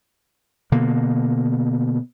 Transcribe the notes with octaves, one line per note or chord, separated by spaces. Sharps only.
B2 D3 A#3